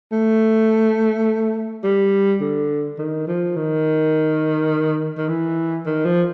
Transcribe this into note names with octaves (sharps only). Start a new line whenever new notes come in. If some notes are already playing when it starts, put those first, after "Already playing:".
A3
G3
D3
D#3
F3
D#3
D#3
E3
D#3
F3